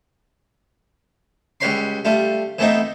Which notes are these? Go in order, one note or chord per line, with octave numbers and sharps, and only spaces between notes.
C#2 G3 B4 C#5 B5 C6
G3 A3 F4
E3 A3 B3 C4 D#4